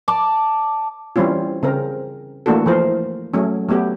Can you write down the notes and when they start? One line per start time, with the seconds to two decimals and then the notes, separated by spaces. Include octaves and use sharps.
0.08 D5 A5 D6
1.16 E3 G3 C4 C#4 F4
1.63 C#3 C4 A#4
2.46 E3 A3 A#3 D4 F#4 A4
2.66 E3 F3 A#4 C5
3.34 F#3 A3 C#4
3.69 F#3 A3 B3 G4